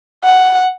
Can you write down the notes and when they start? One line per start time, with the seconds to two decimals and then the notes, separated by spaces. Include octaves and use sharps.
0.24 F#5